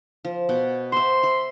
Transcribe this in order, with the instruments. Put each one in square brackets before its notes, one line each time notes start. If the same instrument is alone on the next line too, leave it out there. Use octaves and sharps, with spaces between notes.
[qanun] F3
B2 F#5 G5
[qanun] C5 E5 [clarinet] C6
[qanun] E5 B5